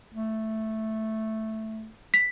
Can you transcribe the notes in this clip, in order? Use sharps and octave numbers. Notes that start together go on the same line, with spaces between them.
A3
B6